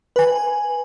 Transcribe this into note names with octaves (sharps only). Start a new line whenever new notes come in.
B4 G#5